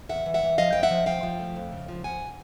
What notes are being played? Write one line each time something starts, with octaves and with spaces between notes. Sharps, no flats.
E2 E5 F#5
E3
E5 F#5
E3
F3 D#5 F5
F2 G5
E5 F#5
F3
F3 F5 G5
F3
A3
F2
C#3
F3
F3 F#5 G#5